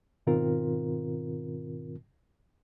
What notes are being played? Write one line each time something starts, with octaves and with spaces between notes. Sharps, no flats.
G#2 B2 D#3 C4 F4 A#4